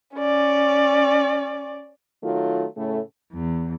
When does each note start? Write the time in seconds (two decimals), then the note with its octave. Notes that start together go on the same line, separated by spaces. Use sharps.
0.16 C#4 D5
2.23 D#3 F#3 A3 F4
2.77 A2 C#3 A3
3.33 E2